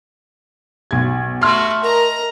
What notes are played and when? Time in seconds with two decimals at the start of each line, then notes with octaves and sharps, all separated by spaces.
0.91 B1 G#6
1.42 A3 F#4 C6 F6
1.83 A#4 D#5 A#5